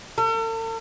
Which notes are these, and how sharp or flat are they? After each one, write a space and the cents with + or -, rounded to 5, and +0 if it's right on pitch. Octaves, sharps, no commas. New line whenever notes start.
A4 +45